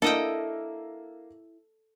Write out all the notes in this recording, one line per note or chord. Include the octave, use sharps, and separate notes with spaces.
A#3 D4 E4 A4 D#5 G5